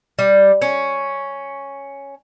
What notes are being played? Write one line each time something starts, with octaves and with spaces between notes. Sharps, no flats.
G3
C#4